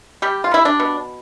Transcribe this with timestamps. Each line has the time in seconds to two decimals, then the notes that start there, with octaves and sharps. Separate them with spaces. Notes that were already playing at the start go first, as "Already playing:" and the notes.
0.22 G3 G4
0.44 F4
0.51 G3 E4
0.65 D4
0.80 B2